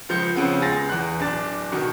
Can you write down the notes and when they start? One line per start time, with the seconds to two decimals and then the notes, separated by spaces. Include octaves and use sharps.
0.09 C#2 F3 G6 C#7
0.36 C#3 F3 B3 C4
0.62 C#2 G#4 A6 A#6
0.89 E2 F#6
1.19 D1 D4 A6
1.72 B2 D#3